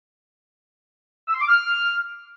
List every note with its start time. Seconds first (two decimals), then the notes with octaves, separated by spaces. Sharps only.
1.28 E6
1.35 C6
1.41 D6
1.47 F6